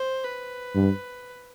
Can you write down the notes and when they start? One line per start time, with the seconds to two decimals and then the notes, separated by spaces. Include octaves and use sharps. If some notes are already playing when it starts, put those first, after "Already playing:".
Already playing: C5
0.23 B4
0.75 G2